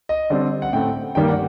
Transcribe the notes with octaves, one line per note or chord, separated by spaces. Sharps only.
D#5
D3 G3 C4 D5
F#5
A2 A3 C4 G5
G2 D#3 G3 A#3 G5
F#5